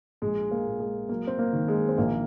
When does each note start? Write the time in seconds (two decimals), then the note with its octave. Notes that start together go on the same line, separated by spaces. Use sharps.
0.22 A#1 G#3
0.51 A#3
0.66 A#2
0.80 G#3
1.09 F#3 A#3
1.27 C4
1.39 A#3
1.53 D#3
1.68 G#3
1.89 C4
1.98 A#1 A#3